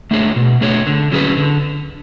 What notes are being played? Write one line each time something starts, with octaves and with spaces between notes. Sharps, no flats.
A3 D4 G#4 C#5
B2
A3 D4 G#4 C#5
D3
F#3 C#4 G#4 B4
D3